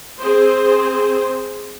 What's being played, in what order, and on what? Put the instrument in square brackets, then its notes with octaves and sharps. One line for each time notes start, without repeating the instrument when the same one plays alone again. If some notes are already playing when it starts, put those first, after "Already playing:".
[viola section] C4 G#4 C5